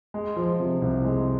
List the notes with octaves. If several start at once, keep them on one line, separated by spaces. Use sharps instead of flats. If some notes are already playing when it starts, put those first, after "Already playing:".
G#3
F3
C3
C2
G#3